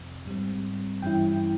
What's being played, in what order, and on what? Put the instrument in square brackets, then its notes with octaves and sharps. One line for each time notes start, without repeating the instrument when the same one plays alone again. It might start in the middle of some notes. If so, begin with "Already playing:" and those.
Already playing: [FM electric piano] F2 C3 F3 C4
G#2 G3 C4
G2 E3 G3 C#4 E4 G5